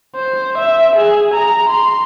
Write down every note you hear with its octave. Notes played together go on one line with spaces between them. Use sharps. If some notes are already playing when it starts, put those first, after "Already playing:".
C5
E5
G#4
A#5
C6